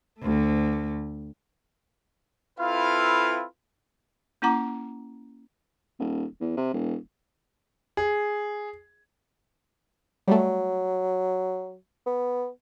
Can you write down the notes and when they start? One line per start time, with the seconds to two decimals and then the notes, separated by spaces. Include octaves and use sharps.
0.20 D2 A3
2.59 C4 E4 F4 A4 B4 F5
4.42 A#3 C#4 E4 F#5 A#5 D6
5.99 D#1
6.41 E2
6.57 C3
6.74 E1
7.97 G#4
10.28 F#3 G3 A3
12.06 B3